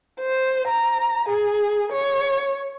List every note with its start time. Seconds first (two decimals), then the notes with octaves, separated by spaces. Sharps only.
0.20 C5
0.68 A#5
1.29 G#4
1.92 C#5